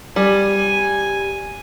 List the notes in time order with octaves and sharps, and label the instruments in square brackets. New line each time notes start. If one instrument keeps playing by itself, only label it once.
[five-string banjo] G3 [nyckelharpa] G#5